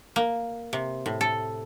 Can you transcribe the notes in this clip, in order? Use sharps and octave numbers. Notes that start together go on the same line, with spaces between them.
A#3
C3
A2
A4